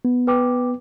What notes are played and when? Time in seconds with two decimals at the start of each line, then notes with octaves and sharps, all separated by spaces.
0.05 B3
0.27 B4 G5 D6